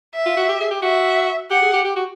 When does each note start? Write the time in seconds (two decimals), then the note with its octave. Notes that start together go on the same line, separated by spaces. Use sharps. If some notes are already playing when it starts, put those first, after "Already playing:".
0.15 E5
0.26 F4
0.37 F#4
0.49 G4
0.60 G#4
0.71 G4
0.82 F#4 E5
1.50 G4 F#5
1.62 G#4
1.73 G4
1.85 G4
1.96 F#4